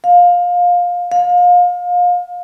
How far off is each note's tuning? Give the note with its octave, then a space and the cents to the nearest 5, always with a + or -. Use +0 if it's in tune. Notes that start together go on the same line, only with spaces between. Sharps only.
F5 +20
F5 +30